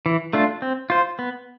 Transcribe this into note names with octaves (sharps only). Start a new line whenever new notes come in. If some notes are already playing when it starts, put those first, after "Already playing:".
E3
A3 D4 F4
C4
F4 C5
B3